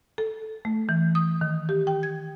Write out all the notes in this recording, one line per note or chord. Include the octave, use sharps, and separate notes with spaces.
A4
A3
E3
D#6
D#3
G4
G5
G#6